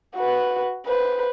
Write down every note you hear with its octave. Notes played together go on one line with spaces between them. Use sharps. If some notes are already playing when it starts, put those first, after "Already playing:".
F#4 B4
B4 C5